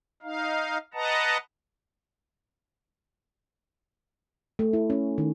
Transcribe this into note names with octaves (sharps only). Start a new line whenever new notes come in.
D#4 F5
B4 D#5 F#5 A5 A#5
A3
E4
C#4
D#3